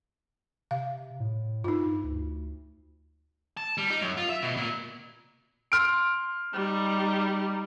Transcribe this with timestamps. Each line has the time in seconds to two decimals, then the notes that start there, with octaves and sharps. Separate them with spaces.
0.71 C3 F5
1.20 A2
1.64 G2 D#4 F4
2.04 D2
3.57 A5
3.78 G3
3.90 D#4
4.01 F#2
4.17 F4
4.29 E5
4.42 B2
4.57 A#2
5.72 C6 F6 D7
6.55 G3 D#4